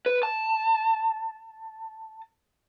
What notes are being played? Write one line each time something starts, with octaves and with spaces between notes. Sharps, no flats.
B4
A5